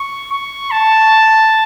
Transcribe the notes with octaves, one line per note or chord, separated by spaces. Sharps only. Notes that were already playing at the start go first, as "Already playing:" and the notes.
Already playing: C#6
C#6
A5